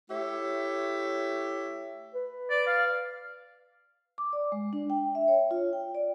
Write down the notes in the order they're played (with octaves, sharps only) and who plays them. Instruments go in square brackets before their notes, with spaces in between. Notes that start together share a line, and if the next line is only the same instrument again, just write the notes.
[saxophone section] A3 E4 G4 C#5 E5
[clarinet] B4
[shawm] D5
F5
[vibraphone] D6
D5
G#3
D4
G5
E5
C#5
F4
G5
D5